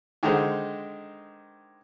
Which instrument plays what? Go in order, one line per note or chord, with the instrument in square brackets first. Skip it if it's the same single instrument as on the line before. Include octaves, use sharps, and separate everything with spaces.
[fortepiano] D3 D#3 G#3 D#4 C5